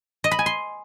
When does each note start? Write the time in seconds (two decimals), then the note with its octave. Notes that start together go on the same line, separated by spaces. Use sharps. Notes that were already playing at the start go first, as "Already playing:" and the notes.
0.24 D#5
0.31 B5
0.39 G#5
0.46 C6